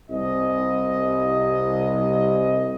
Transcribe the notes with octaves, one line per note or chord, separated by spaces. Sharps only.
C2 D#5